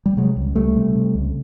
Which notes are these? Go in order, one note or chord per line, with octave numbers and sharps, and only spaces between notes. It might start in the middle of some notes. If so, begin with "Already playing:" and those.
G3
C3 F#3 G#3
C#2
C#2 G3 A3
C3
C3
C#2